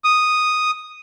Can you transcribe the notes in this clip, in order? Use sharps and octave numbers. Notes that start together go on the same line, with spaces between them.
D#6